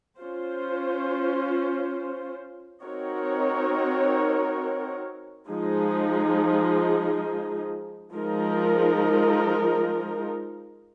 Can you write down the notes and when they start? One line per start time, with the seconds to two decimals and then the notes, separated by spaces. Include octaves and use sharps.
0.19 C#4 F4 C5
2.83 C4 D#4 F#4 A#4 C#5
5.48 F3 G#3 D#4 G#4
8.12 F3 G#3 D#4 A#4